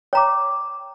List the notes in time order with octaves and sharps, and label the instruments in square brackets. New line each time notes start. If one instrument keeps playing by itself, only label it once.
[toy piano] C#5 A#5 [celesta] G5 D6